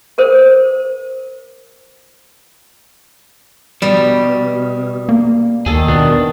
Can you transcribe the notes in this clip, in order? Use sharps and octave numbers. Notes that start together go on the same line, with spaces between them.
A4 A#4 C5
B2 G3
A#3
D#2 D#3 G#4 A4
B2 B3 D4